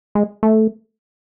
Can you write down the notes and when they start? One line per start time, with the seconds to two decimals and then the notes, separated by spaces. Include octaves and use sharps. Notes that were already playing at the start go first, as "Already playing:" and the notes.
0.15 G#3
0.43 A3